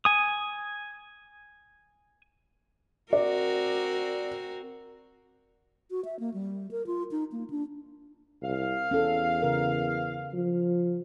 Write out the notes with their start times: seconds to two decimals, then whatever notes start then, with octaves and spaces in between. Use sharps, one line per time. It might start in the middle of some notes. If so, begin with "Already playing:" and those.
0.05 G#5 D#6
3.13 C4 F#4 A#4 D5
5.91 F#4
6.05 E5
6.19 A#3
6.34 G3
6.71 A#4
6.87 F4
7.11 D#4
7.32 A#3
7.50 D4
8.42 C2 F5
8.91 E2 C#4 A4
9.42 C#3 A#4
10.33 F3